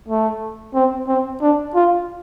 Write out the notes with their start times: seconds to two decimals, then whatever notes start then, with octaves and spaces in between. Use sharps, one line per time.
0.08 A3
0.74 C4
1.08 C4
1.42 D4
1.75 F4